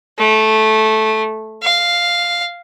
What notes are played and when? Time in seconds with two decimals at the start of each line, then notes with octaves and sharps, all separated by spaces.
0.18 A3
1.62 F5